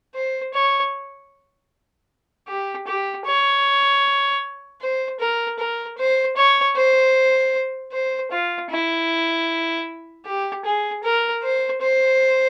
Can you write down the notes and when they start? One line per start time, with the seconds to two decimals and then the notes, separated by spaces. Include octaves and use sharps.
0.15 C5
0.54 C#5
2.48 G4
2.87 G4
3.26 C#5
4.81 C5
5.20 A#4
5.59 A#4
5.98 C5
6.37 C#5
6.76 C5
7.93 C5
8.32 F4
8.70 E4
10.26 G4
10.65 G#4
11.04 A#4
11.43 C5
11.82 C5